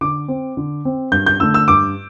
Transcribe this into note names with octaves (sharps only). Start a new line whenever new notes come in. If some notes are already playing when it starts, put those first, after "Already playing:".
D3 D6
C4
D3
C4
G2 G6
G6
D3 A3 E6
E6
G2 D6